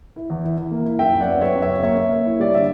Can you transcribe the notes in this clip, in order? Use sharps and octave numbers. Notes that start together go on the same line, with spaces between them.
E4
E2
E4
E4
A#3
E4
F#2 E5 G5
F#2
D5 F#5
B3
B3 C#5 E5
F#2
C#5 E5
C#3
A#3 C#5 E5
A#3
A#3
E4
G3 D5
D3 E5